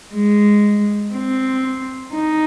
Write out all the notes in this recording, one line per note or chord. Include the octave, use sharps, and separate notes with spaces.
G#3
C4
D#4